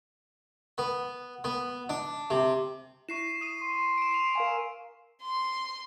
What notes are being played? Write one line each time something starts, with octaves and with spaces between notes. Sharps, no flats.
B3
B3
D4
C3
E4 C#6 C7 E7
D#6 D#7 E7
C6
D7 E7
C7 E7 F7
A#4 F5 G#5
C6